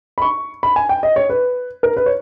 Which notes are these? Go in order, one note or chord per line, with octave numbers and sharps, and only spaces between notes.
B5
C#6
B5
G#5
G5
D#5
C#5
B4
A#4
B4
C#5